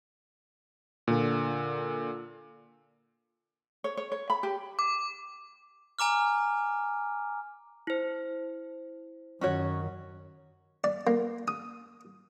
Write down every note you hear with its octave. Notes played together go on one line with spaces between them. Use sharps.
A#2 D3
C#5
C#5
C#5
B5
G4
D6
G#5 A#5 D6 F6
E4 C5
F#2 D#3 C#4 F#4 C#5
D5
A#3
D#6